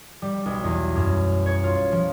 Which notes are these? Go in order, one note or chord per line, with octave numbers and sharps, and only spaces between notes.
G3
B1
E2
F#2
C#5
F4
F3